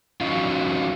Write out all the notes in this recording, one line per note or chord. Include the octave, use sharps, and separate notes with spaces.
E3 F#3 C#4 D#4 F4